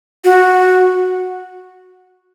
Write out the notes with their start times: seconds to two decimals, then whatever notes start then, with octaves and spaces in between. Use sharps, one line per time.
0.24 F#4